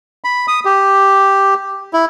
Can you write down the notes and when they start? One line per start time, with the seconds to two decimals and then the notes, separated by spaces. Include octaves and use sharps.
0.24 B5
0.48 D#6
0.65 G4
1.93 E4